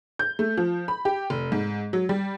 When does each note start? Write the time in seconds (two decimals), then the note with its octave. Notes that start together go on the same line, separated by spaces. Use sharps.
0.19 G6
0.39 A3
0.58 F3
0.88 B5
1.05 G4
1.30 F1
1.52 G#2
1.93 F#3
2.09 G3